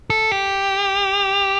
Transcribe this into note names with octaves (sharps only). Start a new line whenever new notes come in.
A4
G4